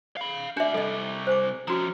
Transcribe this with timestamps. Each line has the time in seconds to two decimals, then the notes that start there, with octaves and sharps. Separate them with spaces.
0.17 F5 B5
0.57 D4 F#4 D5 E5
0.74 C3 G3 A4 D#5
1.27 C5 G#5 D6
1.68 F3 C#4 F#4 A#5